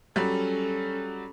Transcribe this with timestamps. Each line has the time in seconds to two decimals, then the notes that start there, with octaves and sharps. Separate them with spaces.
0.16 F#3 G3 C#4 A4